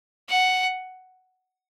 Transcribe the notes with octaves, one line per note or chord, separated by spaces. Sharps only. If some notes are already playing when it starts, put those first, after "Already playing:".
F#5